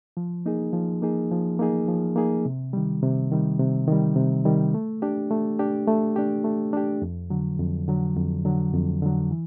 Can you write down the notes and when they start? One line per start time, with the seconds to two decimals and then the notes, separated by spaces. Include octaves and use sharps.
0.17 F3
0.46 A#3 D#4 G#4
0.73 F3
1.02 A#3 D#4 G#4
1.31 F3
1.59 A#3 D#4 G#4
1.88 F3
2.16 A#3 D#4 G#4
2.45 C3
2.73 D#3 G3
3.03 C3
3.31 D#3 G3
3.59 C3
3.88 D#3 G3
4.16 C3
4.45 D#3 G3
4.74 A3
5.02 D4 G4
5.31 A3
5.59 D4 G4
5.87 A3
6.16 D4 G4
6.44 A3
6.73 D4 G4
7.02 F2
7.30 D3 F#3
7.59 F2
7.88 D3 F#3
8.17 F2
8.45 D3 F#3
8.74 F2
9.02 D3 F#3
9.31 E3